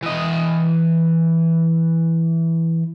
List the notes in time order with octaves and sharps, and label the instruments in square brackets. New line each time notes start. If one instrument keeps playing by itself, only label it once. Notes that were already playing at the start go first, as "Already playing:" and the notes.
[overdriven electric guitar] E3 D#5